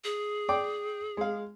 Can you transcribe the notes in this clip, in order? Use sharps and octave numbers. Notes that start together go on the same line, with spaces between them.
G#4
D5 G5 D6
G#3 F5